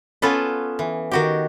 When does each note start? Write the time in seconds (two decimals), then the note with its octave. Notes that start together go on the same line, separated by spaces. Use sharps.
0.22 B3 C#4 F4 A4 B4
0.79 E3
1.11 D#3 F#4 G4